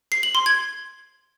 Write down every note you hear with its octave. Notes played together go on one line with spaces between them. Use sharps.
C7
F#7
C6
G#6